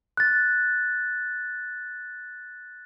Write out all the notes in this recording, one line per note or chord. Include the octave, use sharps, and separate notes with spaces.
F#6 A6